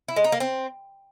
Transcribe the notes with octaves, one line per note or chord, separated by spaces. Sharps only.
E4
G#3
D#4
A#3
C4